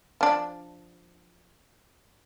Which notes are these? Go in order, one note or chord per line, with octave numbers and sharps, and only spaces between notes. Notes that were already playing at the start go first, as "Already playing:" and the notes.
F3 D4